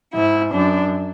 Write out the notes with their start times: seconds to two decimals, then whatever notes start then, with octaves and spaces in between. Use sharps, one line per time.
0.14 G#2 E4
0.53 F#2 D4